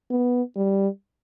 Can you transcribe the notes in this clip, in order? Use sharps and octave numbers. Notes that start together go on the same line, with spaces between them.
B3
G3